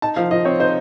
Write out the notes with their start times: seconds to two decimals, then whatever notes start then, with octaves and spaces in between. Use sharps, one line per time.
0.02 D#4 A5
0.16 F3 F5
0.31 F3 D#5
0.45 C4 C#5
0.60 D#4 C5